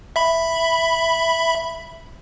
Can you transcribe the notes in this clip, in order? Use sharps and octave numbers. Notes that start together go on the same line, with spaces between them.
E5 B5